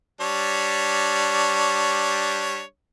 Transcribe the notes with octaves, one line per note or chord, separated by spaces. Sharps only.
G3 D4 C#5